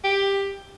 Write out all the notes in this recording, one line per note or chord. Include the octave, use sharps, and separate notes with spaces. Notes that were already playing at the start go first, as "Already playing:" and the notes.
G4